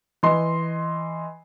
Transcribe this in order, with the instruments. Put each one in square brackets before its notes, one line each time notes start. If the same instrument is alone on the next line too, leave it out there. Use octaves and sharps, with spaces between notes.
[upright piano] E3 D#5 C6